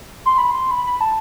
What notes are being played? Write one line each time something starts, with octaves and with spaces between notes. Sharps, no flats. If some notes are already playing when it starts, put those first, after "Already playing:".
C6
B5
C6
B5
B5
A5